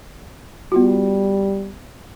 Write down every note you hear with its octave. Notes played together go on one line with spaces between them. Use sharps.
G3 B3 F4 F#4